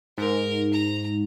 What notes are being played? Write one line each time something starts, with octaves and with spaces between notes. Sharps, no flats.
G#2 A#4
A#5